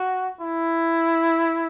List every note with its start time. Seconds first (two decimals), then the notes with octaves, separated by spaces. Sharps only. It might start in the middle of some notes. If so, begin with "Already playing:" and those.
Already playing: F#4
0.41 E4